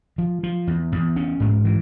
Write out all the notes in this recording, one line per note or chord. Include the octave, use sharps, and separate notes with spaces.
F3
F3
E2
E2
C#4
G#2
E3